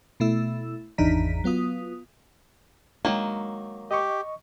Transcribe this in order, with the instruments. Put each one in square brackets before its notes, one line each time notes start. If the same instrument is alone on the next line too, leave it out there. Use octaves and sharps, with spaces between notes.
[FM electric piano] B2 A3 E4 E6
G#1 E2 D4 D#4 A#5 B6
F#3 B3 F4 D#6
[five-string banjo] D#3 F#3 A#3 [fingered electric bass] G#3 D4
[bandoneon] G4 [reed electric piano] D#5 C#6